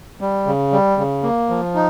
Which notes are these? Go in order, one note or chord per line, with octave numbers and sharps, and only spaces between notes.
G3
C#3
G3
C#3
A#3
F3
D#4